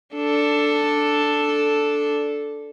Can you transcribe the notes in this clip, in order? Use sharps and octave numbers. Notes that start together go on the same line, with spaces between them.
D4 A4